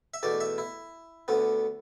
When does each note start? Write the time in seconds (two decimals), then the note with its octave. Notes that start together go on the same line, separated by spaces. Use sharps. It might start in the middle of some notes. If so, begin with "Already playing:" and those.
0.14 E5
0.23 E2 B2 A3 D5
0.40 E5
0.58 E4
1.28 D2 D3 B3